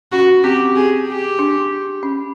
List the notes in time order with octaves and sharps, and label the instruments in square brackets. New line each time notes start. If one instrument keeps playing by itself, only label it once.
[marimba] C#4 [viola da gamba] F#4
[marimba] C4 [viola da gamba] G4
[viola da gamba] G#4
G4
[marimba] D4
C#4